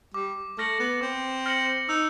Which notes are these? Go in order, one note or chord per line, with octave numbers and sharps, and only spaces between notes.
G3 D6
A3 F6 A#6 C#7 F#7
B3
C4 D6
F6 A#6 C#7 F#7
D#4 E6